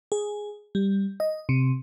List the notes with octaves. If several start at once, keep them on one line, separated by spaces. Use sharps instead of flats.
G#4
G3
D#5
C3